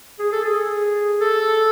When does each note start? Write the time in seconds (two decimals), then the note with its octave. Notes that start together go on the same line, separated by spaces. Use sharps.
0.19 G#4
0.32 A4
0.45 G#4
1.21 A4